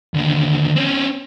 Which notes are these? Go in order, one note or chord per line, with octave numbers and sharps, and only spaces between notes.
D#2 D3
C4 C#4